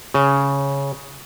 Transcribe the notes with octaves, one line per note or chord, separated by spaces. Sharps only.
C#3